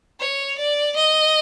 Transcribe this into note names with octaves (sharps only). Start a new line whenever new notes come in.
C#5
D5
D#5